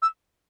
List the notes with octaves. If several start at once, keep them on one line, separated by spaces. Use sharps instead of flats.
E6